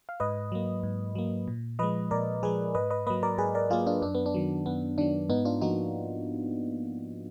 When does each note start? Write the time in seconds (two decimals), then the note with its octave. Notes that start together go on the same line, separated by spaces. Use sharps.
0.09 F5
0.20 G#2 B4 D#5
0.52 F#3 A#3
0.83 G#2
1.15 F#3 A#3
1.48 A#2
1.79 F3 G#3 B4 D#5
2.11 A#2 A#4 D5
2.43 F3 G#3 G#4 B4
2.75 G#2 B4 D#5
2.90 B4 D#5
3.07 F#3 A#3 B4 D#5
3.23 A#4 D5
3.38 G#2 G#4 B4
3.55 A#4 D5
3.70 F#3 A#3 F4 G#4
3.86 D4 F4
4.02 F#2 D4
4.15 B3
4.26 D4
4.34 D#3 F#3
4.66 F#2 B3
4.98 D#3 F#3 D4
5.29 G#2 B3 D#4
5.45 D4 F4
5.61 F3 A#3 D#4 F#4